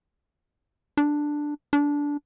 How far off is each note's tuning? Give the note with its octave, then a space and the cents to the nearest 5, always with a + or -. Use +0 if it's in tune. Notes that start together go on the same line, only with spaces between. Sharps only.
D4 +5
D4 -15